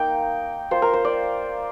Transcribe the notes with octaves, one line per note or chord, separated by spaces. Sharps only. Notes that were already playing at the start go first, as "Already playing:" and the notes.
Already playing: A#3 D#4 G5
A#3 F4 C5
A#4
C5
D5